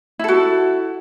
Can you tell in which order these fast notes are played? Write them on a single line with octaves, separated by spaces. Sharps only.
E4 A4 F#4